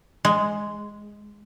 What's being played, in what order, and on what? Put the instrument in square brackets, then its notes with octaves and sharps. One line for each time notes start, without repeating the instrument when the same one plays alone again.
[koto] G#3